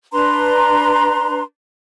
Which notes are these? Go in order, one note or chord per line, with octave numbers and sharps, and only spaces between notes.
D4 B4 A#5 C6